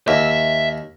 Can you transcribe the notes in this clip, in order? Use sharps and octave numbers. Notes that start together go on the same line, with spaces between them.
D#2 E5